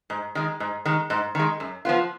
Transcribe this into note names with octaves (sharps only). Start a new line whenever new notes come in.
G#2
D#3 G#3
G#2
D#3 G#3
G#2
D#3 G#3
F#2
F3 B3 F4